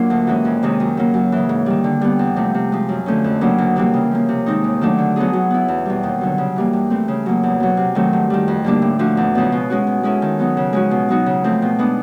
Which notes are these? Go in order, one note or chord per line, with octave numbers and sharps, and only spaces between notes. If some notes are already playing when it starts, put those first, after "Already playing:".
Already playing: F#3 A#3 D4 F4
D2
C3 E3 G#3 C#4
F2
C3 D#3 G#3 C#4
F#2
C#3 F#3 A#3
F#2
C#3 E3
G#2
D#3 G3
D3
G3 B3
E2
C3 F3 A3
C3
F3 G#3
F#2
D3 F3 A3 C#4
F2
C#3 F#3 A#3 D4
D2
C3 E3 G3 A#3
C#3
F3 A#3
C3
D#3 G#3 C4 D#4
D#2
D#3 F#3 A3 D4
D3
F#3 B3 D#4 G#4
F#3
B3 E4
E2
B2 G3
D#2
D3 F#3
C#3
E3 G3 A#3
G2
E3 A3 C4
C#3
F#3 A#3
E2
B2 F#3
C3
D#3 F#3 A3 C4
G2
D#3 G3
F2
D3 G3 A#3 D4
A2
F3 A3 D4 F#4
E2
C#3 F3 G#3 B3
B2
G#3 C#4 F#4
B2
G#3 C#4 E4 A4
D#3
F#3 B3 D#4
C#3
F3 G#3 C#4 F#4
B2
F#3 B3 D#4 F#4
C#3
F3 A3 C4
B2
G#3 B3 D4